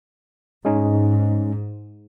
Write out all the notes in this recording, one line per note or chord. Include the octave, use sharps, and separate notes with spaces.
G#2 G#3 C#4 D#4